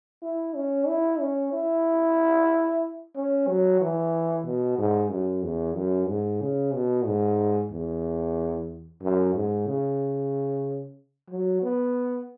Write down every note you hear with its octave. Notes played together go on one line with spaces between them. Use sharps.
E4
C#4
E4
C#4
E4
C#4
F#3
E3
B2
G#2
F#2
E2
F#2
G#2
C#3
B2
G#2
E2
F#2
G#2
C#3
F#3
B3